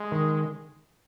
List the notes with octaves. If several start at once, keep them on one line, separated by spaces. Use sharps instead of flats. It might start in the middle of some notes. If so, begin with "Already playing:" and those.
Already playing: G#3
D#3